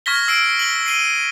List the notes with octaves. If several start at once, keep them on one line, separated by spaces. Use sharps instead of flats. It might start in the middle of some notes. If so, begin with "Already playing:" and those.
C#6 F6 G#6 A#6 B6 G7
E6 C7 D7
F#7 G7
C7 D#7 G7